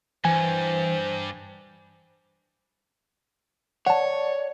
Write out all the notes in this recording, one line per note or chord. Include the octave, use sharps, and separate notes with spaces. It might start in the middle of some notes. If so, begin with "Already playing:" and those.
G2 E3 C5 G#5
C#5 D5 F#5 A5